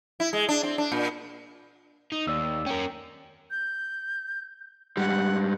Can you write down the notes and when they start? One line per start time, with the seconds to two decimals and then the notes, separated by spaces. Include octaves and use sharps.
0.20 E4
0.33 G#3
0.49 D4
0.63 C4
0.78 D4
0.92 A#2
2.12 D#4
2.27 D#2 D5 E6
2.66 C#4 A#4 G5
3.51 G6
4.97 G#2 G3 F#5